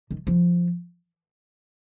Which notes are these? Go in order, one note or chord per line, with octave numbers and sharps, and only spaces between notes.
D#3
F3